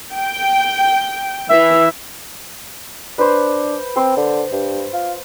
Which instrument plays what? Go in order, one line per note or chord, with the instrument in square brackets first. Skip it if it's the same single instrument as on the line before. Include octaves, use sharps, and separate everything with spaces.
[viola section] G5
[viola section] E3 [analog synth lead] E5
[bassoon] D4 [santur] B4 C5
[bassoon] C4 [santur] C5
[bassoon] D3
G2
F4